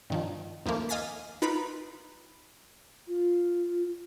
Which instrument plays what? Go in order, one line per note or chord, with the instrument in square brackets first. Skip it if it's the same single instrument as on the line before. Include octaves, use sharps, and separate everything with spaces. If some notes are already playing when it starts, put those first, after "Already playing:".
[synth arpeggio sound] G2 D#3 F3
D#2 F3 A3 A#3
D#5 F5 G#5 A6 B6
D#4 F4 A#4 B4 B5
[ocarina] F4